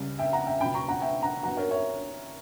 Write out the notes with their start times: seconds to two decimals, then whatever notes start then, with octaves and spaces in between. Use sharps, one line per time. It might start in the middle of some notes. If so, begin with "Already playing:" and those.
Already playing: C#2 C#3 G3
0.19 E5 G5
0.32 F#5 A#5
0.46 E5 G5
0.61 C#2 B2 F#3 G5 B5
0.74 A#5 C#6
0.88 F#5 A#5
1.01 E5 G5
1.23 F#5 A#5
1.43 G2 F#3 B3 F#5 A#5
1.57 A#4 C#5
1.71 C#5 E5